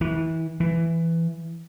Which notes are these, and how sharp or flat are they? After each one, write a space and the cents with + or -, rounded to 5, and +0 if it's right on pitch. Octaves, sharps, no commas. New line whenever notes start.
E3 -25
E3 +10